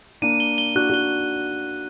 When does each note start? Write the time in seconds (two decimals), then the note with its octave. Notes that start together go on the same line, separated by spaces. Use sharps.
0.22 A#3 D4 D#7
0.40 G7
0.58 G7
0.76 D4 F#4 F#6
0.90 D4 F#4 G7